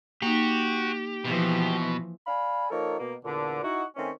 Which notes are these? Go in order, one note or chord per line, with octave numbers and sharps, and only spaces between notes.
A#3 D#4 F#4 G4
B2 E3 F3
D5 F5 G#5 B5
F3 A#3 D#4 A4 A#4 C#5
B2 A#3
E2 A#2 D3
D#4 E4 F#4
D#3 A3 C4 C#4